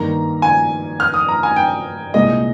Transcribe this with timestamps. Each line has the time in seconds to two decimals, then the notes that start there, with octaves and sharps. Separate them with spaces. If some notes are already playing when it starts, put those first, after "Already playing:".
Already playing: G2 D#3 A#3 A#5
0.42 G#5
1.00 F6
1.14 D#6
1.28 A#5
1.43 G#5
1.56 G5
2.14 C2 A#2 G#3 D#5